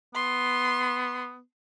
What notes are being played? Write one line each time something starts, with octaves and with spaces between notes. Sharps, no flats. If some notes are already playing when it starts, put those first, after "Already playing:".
B3 C6